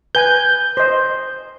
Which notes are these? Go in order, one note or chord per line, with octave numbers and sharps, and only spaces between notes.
B4 G#5 G6
C5 D#5